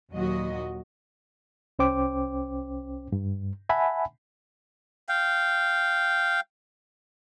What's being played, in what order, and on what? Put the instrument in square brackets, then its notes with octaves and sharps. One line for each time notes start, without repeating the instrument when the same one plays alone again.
[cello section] D#2 A#2 F#3 F#4 D#5
[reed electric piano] C2 C#4 C5 G5 D6
G2
E5 F#5 G#5 A5 B5
[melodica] F5 G5